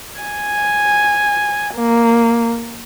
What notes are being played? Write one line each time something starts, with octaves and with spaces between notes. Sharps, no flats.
G#5
A#3